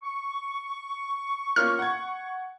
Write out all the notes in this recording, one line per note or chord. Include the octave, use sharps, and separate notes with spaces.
C#6
A#3 C#4 F4 F6
F#5 G#6